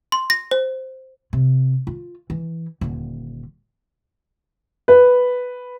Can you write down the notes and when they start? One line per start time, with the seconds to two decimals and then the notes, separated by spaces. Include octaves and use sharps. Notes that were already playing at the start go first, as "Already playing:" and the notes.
0.12 C6
0.30 A#6
0.51 C5
1.33 C3
1.87 F4
2.30 E3
2.81 D#1 D3
4.88 B4